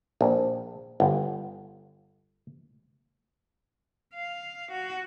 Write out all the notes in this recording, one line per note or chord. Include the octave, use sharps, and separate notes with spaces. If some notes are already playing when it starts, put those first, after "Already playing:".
A#1
G1
F5
F#4